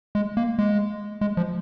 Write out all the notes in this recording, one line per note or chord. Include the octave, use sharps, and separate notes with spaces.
G#3
A#3
G#3
G#3
F3